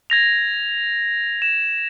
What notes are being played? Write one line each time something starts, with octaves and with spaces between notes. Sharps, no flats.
G#6 A#6 F7
E7